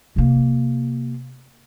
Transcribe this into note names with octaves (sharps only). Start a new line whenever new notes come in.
C3 A#3